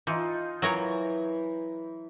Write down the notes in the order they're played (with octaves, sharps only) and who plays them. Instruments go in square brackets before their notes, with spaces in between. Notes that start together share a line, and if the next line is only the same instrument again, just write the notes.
[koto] E3 [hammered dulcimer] D#4 F4
[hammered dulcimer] E3 [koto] F#3 A#4 C#5